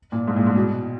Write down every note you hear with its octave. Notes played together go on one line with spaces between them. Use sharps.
A#2
G#2
A#2
G#2
B2